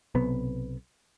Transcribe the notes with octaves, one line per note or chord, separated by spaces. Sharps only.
B1 C3 B3